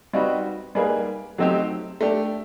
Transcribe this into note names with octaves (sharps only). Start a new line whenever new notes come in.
G3 C4 D#4 F#4 B4
G3 A#3 D#4 G#4 B4
F#3 A3 C4 D#4 G4
A3 D4 G4